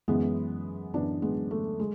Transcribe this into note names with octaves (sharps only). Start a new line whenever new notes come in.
F#2 E3 G#3 B3
F#2 E3 B3 D4
G#3 B3
A3
G#3